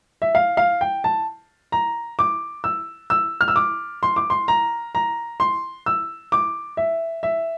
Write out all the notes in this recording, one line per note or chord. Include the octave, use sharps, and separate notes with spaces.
E5
F5
F5
G5
A5
A#5
D6
E6
E6
F6
E6
D6
C6
D6
C6
A#5
A#5
C6
E6
D6
E5
E5